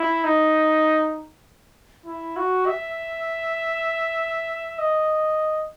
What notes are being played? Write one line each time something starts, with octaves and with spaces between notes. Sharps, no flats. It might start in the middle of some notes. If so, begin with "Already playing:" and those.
Already playing: E4
D#4
E4
F#4
E5
D#5